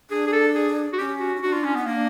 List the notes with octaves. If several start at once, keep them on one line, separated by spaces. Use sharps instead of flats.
D4 G#4
G#4
A4
G#4
F#4
C#4 G4
F#4
D#4
D4 F#4
F4
C#4
B3 D#4
A#3 D4